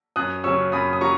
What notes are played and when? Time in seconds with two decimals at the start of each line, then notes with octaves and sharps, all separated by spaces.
0.16 F#2 D#6 F#6
0.44 C#3 F#3 C#4 C#6 E6
0.72 F#2 B5 D#6
0.93 D#6
1.01 F#3 C#4 A#5 C#6